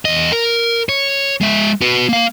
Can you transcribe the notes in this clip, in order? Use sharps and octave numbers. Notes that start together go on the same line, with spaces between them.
E2 D#5
A#4
C#5
G#3 E5
F#4 B4
A#3 F5